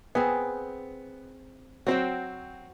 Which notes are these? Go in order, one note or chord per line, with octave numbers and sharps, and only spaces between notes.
B3 C4 G#4
F#3 C4 F#4 C5 G5